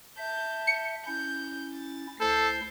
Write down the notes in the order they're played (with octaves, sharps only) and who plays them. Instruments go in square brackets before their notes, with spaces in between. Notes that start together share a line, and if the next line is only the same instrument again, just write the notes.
[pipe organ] E5 [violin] A5 G6
[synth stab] C#7
[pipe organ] C#4 E4 [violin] G6
[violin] A6
[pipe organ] D2 E4 C5 [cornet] A4 [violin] G6 C7